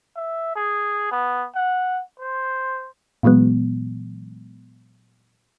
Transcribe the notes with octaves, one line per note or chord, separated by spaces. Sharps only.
E5
G#4
B3
F#5
C5
A#2 E3 F#3 G#3 B3